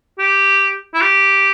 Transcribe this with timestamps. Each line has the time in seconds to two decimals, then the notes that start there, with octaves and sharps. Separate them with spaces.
0.19 G4
0.94 E4
1.01 G4